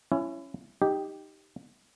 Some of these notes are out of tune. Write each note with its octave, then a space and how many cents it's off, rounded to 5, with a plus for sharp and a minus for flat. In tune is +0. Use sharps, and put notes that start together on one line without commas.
C#4 +0 E4 +25
D#4 +0 G4 +0